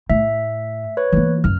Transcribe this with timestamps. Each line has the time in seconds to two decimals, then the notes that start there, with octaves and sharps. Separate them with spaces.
0.10 A2 E5
0.97 B4 C#5
1.12 E3 A#3
1.44 F#2 F6